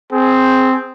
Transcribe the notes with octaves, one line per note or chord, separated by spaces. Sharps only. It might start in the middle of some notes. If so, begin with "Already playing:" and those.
C4 G#4